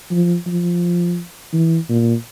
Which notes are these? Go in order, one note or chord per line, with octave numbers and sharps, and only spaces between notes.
F3
F3
E3
A#2